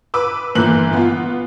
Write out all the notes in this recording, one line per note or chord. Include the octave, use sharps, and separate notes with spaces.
B4 D6 E6
G1 A#2 E3 A#3 F#6 F#7
B3 F4